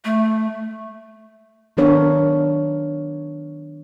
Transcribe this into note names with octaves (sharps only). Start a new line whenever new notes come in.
A3
D#3 F#3 B3 D4 A#4 C#5